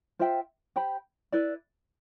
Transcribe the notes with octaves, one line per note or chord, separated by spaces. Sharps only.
F4 C5 E5 G5
G4 C5 G5 B5
E4 B4 D5